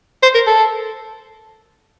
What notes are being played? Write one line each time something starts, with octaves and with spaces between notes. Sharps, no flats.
C5
A#4
A4